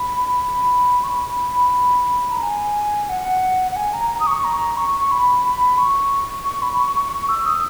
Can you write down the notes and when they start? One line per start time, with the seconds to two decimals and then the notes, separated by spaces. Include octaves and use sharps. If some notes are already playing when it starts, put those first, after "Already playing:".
Already playing: B5
0.41 B5
1.04 C#6
1.08 B5
2.31 A#5
2.43 G#5
3.09 F#5
3.72 F#5
3.76 G#5
3.94 A#5
4.10 A#5
4.20 D#6
4.27 C#6
4.44 A#5
4.77 C#6
5.00 C#6
5.11 B5
5.44 B5
5.78 C#6
6.45 C#6
6.62 B5
6.78 C#6
6.96 C#6
7.12 C#6
7.29 E6
7.46 D#6